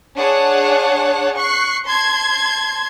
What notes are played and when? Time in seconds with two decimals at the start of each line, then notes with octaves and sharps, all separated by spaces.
0.16 D4 G#4 C#5 F#5 A5
1.35 C#6 F#6 C7
1.86 A5 C6 G#6